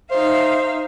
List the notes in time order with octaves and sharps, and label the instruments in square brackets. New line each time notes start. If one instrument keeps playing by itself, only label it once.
[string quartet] D#4 E5 F5 [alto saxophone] C5